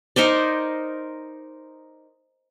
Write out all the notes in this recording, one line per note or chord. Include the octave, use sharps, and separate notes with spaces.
D#4 A#4 C5 D5